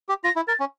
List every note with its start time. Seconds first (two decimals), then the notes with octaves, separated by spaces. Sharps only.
0.09 G4
0.24 F4 A#6
0.36 E4
0.48 A#4 A6
0.60 C#4